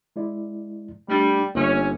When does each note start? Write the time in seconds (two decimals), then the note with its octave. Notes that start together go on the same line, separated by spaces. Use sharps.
0.16 G#3 E4 D5
1.08 G3 A3 D4
1.55 G1 A#3 C#4